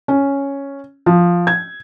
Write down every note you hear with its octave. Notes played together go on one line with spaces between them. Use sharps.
C#4
F3
G#6